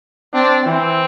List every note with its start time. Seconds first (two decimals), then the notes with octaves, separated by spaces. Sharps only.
0.34 C4 D4
0.66 E3 C4